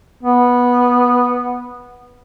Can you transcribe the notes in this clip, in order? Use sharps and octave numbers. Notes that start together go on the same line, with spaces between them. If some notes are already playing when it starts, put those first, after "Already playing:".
B3